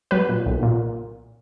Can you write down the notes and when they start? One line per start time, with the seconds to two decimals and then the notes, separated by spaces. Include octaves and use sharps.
0.11 F#3 B4
0.29 A#2
0.46 B1
0.63 A#2